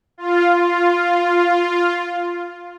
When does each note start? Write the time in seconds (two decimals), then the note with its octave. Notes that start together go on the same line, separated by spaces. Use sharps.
0.18 F4
0.53 F4